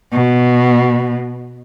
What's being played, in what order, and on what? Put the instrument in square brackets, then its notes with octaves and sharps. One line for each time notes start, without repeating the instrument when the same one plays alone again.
[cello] B2